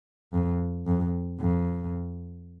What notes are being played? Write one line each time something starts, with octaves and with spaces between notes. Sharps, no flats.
F2
F2
F2